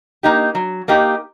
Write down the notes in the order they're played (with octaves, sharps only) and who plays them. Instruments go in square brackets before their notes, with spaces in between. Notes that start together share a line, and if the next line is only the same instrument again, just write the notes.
[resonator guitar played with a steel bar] A#3 D#4 G4
F#3
A#3 D#4 G4